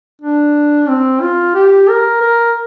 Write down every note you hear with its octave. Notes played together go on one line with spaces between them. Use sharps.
D4
C4
F4
G4
A#4
A#4